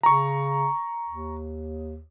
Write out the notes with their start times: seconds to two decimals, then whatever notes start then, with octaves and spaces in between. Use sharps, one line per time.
0.03 C#3 A#5 C#6
1.09 D#2